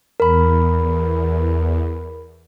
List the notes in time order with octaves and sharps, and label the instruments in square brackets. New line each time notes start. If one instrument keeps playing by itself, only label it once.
[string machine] E2 [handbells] A#4 B5